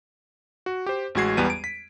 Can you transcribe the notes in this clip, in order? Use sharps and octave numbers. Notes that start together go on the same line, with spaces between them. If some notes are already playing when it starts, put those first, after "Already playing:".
F#4
G4 C5
A1 G#3 F#4 G#6 C7
E2 G3 B3 D#7
D7
B6